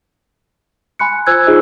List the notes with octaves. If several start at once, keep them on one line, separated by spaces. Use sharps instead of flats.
G#5 B5 C6 F#6 C#7
F4 C5 G#5 E6 F#6 G#6
D#4 F4 G#4 C5 D#5